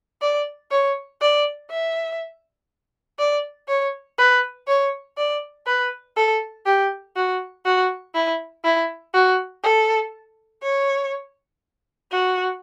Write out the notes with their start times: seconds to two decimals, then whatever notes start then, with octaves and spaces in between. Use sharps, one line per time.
0.22 D5
0.71 C#5
1.21 D5
1.71 E5
3.19 D5
3.69 C#5
4.18 B4
4.68 C#5
5.17 D5
5.67 B4
6.16 A4
6.66 G4
7.16 F#4
7.65 F#4
8.15 E4
8.64 E4
9.14 F#4
9.63 A4
10.63 C#5
12.11 F#4